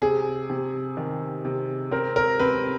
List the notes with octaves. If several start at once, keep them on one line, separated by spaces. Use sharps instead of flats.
C3 G#4
C3
D#3
C3
C4 A#4
A#4
C4 B4